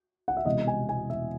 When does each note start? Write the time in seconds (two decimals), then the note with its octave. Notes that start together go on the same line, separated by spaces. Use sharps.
0.28 F#5
0.37 E5
0.45 E1 E2 C3 D#5
0.67 G#5
0.89 G#5
1.10 E5